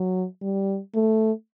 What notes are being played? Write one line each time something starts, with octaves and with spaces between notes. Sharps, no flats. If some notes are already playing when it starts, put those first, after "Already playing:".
Already playing: F#3
G3
A3